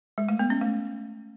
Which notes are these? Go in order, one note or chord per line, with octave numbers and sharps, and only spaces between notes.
G#3
A3
B3
C#4
A3